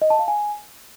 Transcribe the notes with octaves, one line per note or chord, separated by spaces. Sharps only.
D#5
A5
F5
G#5